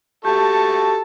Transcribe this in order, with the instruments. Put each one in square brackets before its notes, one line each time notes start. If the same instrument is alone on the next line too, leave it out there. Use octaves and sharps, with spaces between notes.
[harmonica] F#4 A4 C#6 [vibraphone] G4 [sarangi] A5